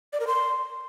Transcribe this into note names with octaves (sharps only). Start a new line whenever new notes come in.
D5
A#4
C6